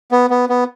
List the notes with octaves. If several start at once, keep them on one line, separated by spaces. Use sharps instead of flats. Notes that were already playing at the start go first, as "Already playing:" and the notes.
B3
B3
B3